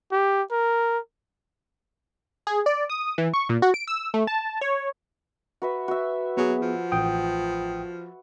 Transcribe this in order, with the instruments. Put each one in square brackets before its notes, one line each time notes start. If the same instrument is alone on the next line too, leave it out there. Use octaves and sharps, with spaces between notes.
[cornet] G4
A#4
[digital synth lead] G#4
D5
D#6
E3
C#6
A#2
F#4
D7
E6
A3
A5
C#5
[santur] F#4 B4 E5
F#4 E5
[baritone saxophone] F#3 [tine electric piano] B3 G#4
[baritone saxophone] F3
[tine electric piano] A1 G5 D#6